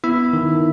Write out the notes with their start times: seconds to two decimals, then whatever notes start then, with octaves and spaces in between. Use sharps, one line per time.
0.04 B3 E4 E5
0.33 D#3